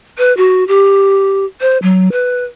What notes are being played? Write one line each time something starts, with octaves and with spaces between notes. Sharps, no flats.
B4
F#4
G4
C5
F#3
B4